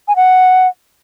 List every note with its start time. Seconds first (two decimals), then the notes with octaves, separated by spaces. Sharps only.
0.08 G#5
0.16 F#5